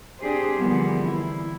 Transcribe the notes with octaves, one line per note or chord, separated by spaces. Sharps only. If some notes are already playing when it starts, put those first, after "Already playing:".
C4 D4 G4 G#4 C5
D3 E3 F3 G3 A#3 B3
E4